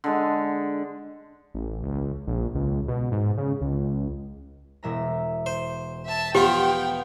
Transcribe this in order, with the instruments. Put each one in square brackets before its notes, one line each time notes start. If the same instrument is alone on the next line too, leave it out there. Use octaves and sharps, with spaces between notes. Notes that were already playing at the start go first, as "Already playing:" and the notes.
[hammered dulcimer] D3 G#3
[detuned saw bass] A1
C#2
A#1
C#2
B2
G#2
C#3
C#2
[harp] E1 E5 A#5
[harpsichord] C5
[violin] E5 A5
[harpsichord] F3 B3 F4 [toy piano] G4 [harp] B4 B6 [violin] F#5 G5